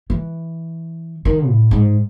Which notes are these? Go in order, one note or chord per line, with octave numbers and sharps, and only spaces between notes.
E3
D#3
A2
G#2